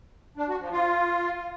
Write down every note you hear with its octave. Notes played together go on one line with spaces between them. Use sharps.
D4
F#4
F3
F4